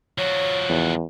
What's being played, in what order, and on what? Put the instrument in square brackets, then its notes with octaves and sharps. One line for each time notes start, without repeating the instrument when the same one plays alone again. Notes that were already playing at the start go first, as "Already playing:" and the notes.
[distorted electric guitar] F3 F#4 [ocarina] C#5
[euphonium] E2